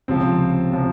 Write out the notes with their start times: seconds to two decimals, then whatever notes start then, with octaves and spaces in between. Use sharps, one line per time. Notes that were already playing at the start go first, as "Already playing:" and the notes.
0.08 C#2 C3 F3 C4
0.72 C3 F3